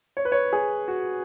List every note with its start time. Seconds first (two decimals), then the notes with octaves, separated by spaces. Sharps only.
0.17 C#5
0.25 B4
0.32 C#5
0.53 G#4
0.88 F#4